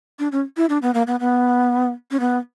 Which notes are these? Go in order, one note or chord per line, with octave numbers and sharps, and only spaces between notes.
D4
C#4
E4
D4
B3
A#3
B3
B3
C#4
B3